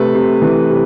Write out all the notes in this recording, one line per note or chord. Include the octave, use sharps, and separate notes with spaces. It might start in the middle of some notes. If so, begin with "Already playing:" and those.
Already playing: C3 A3 B4
C3
E3
C3